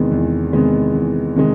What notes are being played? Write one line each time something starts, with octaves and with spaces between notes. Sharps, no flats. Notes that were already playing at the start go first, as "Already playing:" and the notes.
Already playing: E2 C3 D#3 G#3 B3
E2
C3 D#3 G#3 B3
E2
C3 D#3 G#3